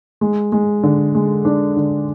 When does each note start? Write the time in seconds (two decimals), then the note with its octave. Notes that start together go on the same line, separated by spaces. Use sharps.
0.21 G#3
0.52 G#3
0.83 D3
1.15 G#3
1.45 D4
1.76 D3